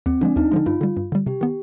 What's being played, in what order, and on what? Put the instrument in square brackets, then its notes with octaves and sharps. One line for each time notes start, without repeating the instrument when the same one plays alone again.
[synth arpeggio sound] D#2 [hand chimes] C4
[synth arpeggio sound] D3 F3 G#3 [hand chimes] D4
[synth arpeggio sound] D#2 [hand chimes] D#4
[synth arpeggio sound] D3 F3 G#3
[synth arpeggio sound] G2 [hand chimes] F4
[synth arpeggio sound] D3 G3
G2
D3 G3
[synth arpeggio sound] C3 [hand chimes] G4
[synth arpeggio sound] D#3 B3